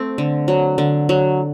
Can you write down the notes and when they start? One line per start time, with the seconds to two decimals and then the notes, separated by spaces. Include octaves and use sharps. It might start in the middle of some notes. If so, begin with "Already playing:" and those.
Already playing: A3 C4
0.18 D3
0.48 F#3
0.78 D3
1.09 F#3